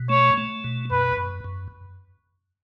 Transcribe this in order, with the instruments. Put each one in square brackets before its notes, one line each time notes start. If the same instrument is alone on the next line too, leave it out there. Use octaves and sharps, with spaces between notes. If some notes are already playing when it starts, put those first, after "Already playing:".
Already playing: [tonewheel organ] B2
[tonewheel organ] A3 [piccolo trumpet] C#5
[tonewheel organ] A3
B2
[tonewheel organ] F#2 [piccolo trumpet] B4
[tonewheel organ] F#2
F#2